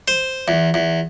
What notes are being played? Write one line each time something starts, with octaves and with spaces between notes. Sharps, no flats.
C5
E2
E2